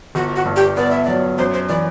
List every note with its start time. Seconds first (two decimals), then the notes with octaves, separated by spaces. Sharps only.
0.15 G1 F#4
0.36 F#4
0.45 G2
0.56 G4
0.77 B3 D5
0.91 E5
1.05 F#3 D5
1.38 F#2 C5
1.54 C5
1.69 E3 D5